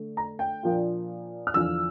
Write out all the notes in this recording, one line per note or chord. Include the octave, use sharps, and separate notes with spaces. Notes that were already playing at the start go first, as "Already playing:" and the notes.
Already playing: D3 A3
A#5
G5
A#2 F3 A#3 D4 F4
F6
E2 D3 F3 E6